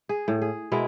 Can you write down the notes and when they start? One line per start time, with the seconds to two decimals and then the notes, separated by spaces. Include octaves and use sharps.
0.09 G#4
0.28 A2
0.42 G#4
0.72 B2 G#3 E4 A#4